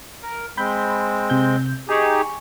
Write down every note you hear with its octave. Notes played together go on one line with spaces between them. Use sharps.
A#4
G#3 C4 B5 G6
C3 G6
D#4 G4 G#4 G#5 C#6